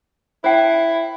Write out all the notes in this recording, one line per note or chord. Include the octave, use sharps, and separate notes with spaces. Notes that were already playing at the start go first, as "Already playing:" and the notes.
E4 C5 G5 A5